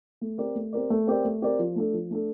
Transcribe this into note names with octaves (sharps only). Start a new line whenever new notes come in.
A3
C4 G4 A#4 D5
A3
C4 G4 A#4 D5
A3
C4 G4 A#4 D5
A3
C4 G4 A#4 D5
F3
A3 D4 A4
F3
A3 D4 A4